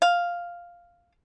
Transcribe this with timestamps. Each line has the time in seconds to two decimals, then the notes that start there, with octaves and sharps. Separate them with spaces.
0.02 F5